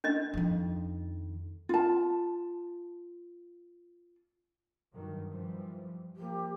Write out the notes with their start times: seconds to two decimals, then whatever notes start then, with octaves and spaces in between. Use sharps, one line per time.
0.04 D4 D#5
0.34 F2 D#3
1.69 F4 A5
4.91 G2 D#3 F#3
5.30 E3 F3 G3
6.16 F3 A#3 G4